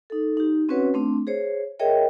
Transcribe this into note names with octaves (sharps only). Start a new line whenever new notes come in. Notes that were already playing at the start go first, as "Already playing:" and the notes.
D#4 A4
D#4 G4
C4 C#4 F#4 B4 C#5 F#5
A3 C4 D4
G#4 C5 C#5
G#4 A#4 C#5 D#5 E5 G5